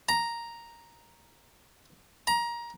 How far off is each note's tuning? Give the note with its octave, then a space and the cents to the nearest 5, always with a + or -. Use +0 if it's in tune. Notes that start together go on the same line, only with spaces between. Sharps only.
A#5 +0
A#5 +20